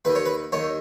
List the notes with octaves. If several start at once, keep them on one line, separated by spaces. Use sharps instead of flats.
D#2 D#3 B4
C#5
B4
D#2 D#3 C#5